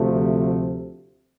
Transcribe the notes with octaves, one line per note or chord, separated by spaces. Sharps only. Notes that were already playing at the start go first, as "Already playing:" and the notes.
Already playing: D2 C3 F3 A3